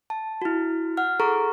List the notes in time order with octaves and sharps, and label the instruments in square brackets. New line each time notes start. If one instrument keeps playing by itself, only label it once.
[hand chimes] A5
E4 F#4
F#5 F6
G#4 A4 A#5 C#6